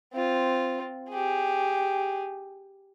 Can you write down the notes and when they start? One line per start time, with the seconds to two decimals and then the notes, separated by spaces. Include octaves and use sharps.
0.13 C4 F4
1.09 G4 G#4